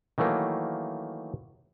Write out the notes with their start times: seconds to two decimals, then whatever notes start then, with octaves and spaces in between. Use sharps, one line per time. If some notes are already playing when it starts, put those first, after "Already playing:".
0.18 D#3 E3 F#3 A3 A#3